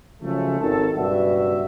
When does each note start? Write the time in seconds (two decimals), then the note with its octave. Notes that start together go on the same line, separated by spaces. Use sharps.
0.22 C#3 F3 F#3 G#3 A3
0.61 G#1 D#3 A4
0.96 F#1 G2 B2 F#4 E5